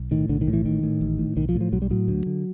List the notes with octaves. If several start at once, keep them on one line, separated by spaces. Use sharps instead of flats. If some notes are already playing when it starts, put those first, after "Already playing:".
Already playing: B1
A2 D#3
B1 D3
D#3
A2
E3
A1 D#3
A2
A1
A2
B1 D#3
F3
A2
F3
B1 F#3
G3
A2 F#3
D2
D3